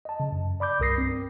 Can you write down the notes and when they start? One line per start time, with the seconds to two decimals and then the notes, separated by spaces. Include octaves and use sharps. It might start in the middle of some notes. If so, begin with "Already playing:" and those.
0.05 D#5 A5
0.20 C#3
0.32 F#2
0.60 D5 B5 D6 G6
0.80 C2 G2 A#4 D#6 A#6 C7
0.98 C4